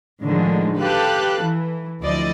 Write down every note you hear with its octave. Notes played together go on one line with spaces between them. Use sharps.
A2 D3 D#3 F3 G#3
G4 A4 B4 F5 A5 F#6
E3
D2 F3 E4 D5 D#5